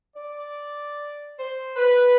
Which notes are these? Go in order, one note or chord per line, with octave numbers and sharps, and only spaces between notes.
D5
C5
B4